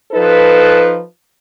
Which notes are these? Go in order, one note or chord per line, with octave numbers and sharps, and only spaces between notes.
F3 D#4 A4 B4